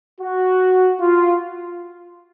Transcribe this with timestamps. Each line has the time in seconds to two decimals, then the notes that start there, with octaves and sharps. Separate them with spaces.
0.21 F#4
1.01 F4